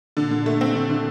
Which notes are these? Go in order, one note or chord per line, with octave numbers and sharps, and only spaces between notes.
A#2 D3
D3
A3
C4
D3
D3